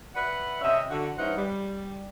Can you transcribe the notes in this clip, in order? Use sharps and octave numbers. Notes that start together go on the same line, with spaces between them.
B4 D5 E5 F#5
C3 C#4 D#5 E5
D3 F#4
G2 E3 C#4 D#4 C5 F#5
G3